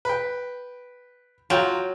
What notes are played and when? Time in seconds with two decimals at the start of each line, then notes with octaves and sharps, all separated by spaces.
0.05 B4 G5
1.50 F#3 F4 G5 A#5